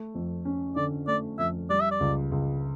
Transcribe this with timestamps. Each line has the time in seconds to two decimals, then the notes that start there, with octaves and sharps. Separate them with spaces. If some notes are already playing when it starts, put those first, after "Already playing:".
Already playing: A3
0.15 F2
0.45 C#4
0.76 D3 D5
1.07 A3 D5
1.38 F2 E5
1.70 G3 D5
1.80 E5
1.91 D5
2.00 C#2
2.32 C#2